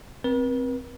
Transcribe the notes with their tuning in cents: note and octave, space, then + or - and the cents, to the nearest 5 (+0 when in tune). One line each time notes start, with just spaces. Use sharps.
C4 +0 B4 -45